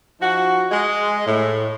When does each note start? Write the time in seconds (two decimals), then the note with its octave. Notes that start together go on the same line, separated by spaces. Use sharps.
0.20 F3 D#4 F#4
0.71 G#3
1.26 A2